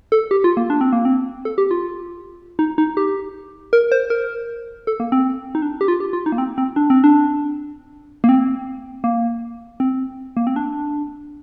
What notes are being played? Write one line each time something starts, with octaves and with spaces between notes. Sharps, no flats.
A4
G4
F4
A#3
D4
C4
A#3
C4
A4
G4
F4
D#4
D#4
G4
A#4
C5
A#4
A4
A#3
C4
D#4
D4
G4
F4
G4
F4
D#4
A#3
C4
C4
D4
C4
D4
A#3
C4
A#3
C4
A#3
C4
D4